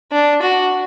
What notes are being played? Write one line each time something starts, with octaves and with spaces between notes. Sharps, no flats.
D4
F#4